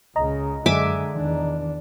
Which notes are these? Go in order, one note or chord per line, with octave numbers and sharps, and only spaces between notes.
C#2 C#3 D#5 A#5
F#2 D3 G#3 E5 G#5 D6
E2 D#3 D4